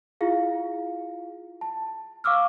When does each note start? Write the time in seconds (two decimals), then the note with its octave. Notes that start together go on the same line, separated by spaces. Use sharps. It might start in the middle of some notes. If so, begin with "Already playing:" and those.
0.21 E4 F4 G#4 F5
1.61 A5
2.24 F5 C#6 D6 E6 F6